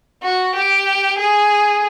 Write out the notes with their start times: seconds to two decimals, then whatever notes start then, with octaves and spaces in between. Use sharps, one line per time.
0.23 F#4
0.55 G4
1.18 G#4